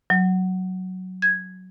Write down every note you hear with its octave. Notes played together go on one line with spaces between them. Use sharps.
F#3
G#6